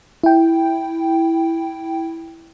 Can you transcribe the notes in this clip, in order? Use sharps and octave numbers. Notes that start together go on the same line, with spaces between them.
E4 G5